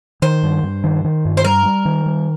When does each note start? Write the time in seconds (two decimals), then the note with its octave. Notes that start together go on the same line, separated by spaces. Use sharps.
0.22 D#3 C5
0.43 G2
0.63 G2
0.84 D#3
1.04 D#3
1.25 G2
1.37 C5
1.45 G3 A#4
1.65 G3
1.85 D#3
2.06 G3